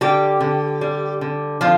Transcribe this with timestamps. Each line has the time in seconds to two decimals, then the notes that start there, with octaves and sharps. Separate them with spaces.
0.01 D3 G3 G4
0.41 D3
0.81 G3
1.21 D3
1.61 D3 F3 F4